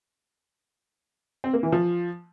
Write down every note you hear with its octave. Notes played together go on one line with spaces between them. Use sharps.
C4
A#3
E3
F3